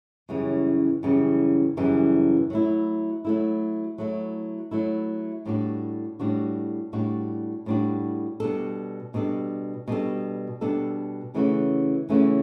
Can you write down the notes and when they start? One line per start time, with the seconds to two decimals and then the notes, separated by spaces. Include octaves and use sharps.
0.29 F#2 C#3 E3 G3
1.03 F#2 C#3 E3 G3
1.77 F#2 C#3 E3 G3
2.50 F#3 A3 E4
3.25 F#3 A3 E4
3.98 F#3 A3 E4
4.71 F#3 A3 E4
5.46 A2 G3 D4 F#4
6.20 A2 G3 D4 F#4
6.93 A2 G3 D4 F#4
7.66 A2 G3 D4 F#4
8.40 B2 G3 D4 A4
9.14 B2 G3 D4 A4
9.88 B2 G3 D4 A4
10.61 B2 G3 D4 A4
11.34 C#3 E3 A3 C#4 F#4
12.09 C#3 E3 A3 C#4 F#4